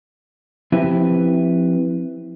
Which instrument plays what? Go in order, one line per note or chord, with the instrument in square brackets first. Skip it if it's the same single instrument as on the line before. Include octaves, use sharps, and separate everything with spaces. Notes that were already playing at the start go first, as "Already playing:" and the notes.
[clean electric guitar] F3 C4 E4 G4 B4 E5